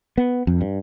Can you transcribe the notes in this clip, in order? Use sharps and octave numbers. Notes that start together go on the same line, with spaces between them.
B3
F2
G2